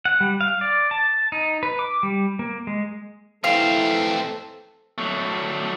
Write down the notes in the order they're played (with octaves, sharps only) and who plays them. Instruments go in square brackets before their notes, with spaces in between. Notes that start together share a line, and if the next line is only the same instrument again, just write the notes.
[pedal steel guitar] F#5
G3
F5
D5
A5
D#4
B4
D6
G3
A#3
G#3
[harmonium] E3 [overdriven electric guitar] A3 C4 [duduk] A4 [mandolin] F5
[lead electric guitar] F#3 A3